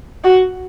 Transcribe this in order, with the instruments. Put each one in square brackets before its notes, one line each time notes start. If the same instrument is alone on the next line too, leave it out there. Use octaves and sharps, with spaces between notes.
[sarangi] F#4